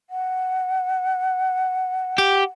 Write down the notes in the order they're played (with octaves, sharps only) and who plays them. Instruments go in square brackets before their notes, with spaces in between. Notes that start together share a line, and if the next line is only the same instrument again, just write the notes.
[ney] F#5
[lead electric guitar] G4